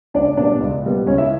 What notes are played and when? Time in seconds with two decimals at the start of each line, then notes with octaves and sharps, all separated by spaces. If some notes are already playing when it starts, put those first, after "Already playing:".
0.14 C#2 D4 D5
0.37 B2 G3 B3 D4 D5
0.60 C#2
0.83 B2 G3 B3
1.06 C#2 C#4 C#5
1.18 E4 E5